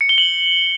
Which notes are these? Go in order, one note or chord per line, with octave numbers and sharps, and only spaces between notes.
C#7
G7
F#7